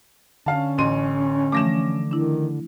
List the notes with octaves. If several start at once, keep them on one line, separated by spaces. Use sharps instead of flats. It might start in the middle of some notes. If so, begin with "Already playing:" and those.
D3 C#4 F5 A5
A1 C6 D#7
E3 F3 A3 D6 A#6 E7
D#3 D4 E4